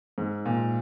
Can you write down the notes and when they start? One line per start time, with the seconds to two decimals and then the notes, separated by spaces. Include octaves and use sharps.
0.18 G#2
0.46 A#2